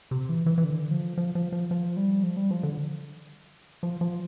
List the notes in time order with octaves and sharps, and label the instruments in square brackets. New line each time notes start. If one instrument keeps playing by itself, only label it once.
[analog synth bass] C3
E3
E3
E3
D3
F3
F3
F3
F3
F3
G3
F3
G3
F3
D3
F3
F3